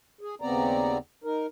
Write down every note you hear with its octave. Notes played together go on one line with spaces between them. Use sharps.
G#4
D#2 C#3 B3 C4 D5 A#5
D#4 A#4